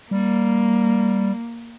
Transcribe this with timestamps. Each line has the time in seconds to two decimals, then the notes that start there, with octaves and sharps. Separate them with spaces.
0.11 G3 A#3